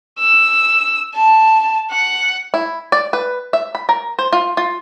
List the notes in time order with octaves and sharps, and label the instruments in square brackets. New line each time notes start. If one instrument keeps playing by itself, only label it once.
[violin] E6
A5
F#5
[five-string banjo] E4
D5
B4
E5
B5
A#4
C5
F4
F4